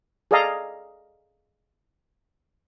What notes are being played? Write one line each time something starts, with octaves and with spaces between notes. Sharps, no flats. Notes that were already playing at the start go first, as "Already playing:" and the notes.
G#4 A4 D5 D#5 F5 A#5